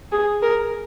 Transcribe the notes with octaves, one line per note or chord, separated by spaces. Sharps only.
G#4
A#4